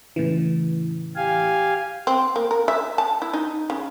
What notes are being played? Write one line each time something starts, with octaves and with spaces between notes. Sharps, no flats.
A2 C#3 E3
G4 F5 G#5
C4
A#3
A#4
E5
A5
E4
D#4
C#3